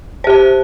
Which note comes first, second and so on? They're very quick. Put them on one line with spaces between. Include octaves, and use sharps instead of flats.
C5 G4 A5